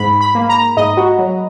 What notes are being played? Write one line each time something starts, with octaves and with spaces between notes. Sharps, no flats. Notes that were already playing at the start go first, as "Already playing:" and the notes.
Already playing: G#2 B5
B5
A#3
A#5
G#2 D#5
F#4
F#3